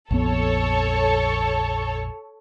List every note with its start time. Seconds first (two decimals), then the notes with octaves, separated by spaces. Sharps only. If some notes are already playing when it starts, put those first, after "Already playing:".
0.11 A#1 F2 B3 A4 C#5